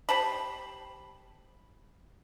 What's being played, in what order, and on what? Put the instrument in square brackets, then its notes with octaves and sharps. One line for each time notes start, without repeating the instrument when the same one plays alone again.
[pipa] G4 C5 A5 B5